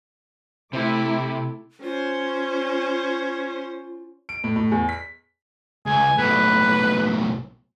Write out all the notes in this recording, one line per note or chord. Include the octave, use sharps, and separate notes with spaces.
C3 A3 E4 D6
C#4 F4 C5
D7
A2
A2
E2
B6
C#2 G#5
B1 A2 B4